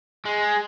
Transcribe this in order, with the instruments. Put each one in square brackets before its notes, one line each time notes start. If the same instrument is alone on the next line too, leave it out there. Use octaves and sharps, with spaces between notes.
[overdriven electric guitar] G#3